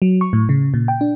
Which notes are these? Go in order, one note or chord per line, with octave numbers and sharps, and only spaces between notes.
F#3
C#6
A2
C#3
A#2
G5
D4